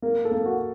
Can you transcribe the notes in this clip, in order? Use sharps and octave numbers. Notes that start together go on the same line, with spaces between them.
A#3 A#4
A4
A#3
F#4